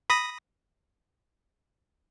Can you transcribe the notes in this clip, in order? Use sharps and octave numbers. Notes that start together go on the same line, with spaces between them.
B5 D#6 A#6